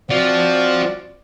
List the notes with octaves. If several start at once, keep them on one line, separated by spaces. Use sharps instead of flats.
F3 C4 F#4 D5